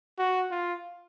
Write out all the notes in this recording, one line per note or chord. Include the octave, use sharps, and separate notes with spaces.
F#4
F4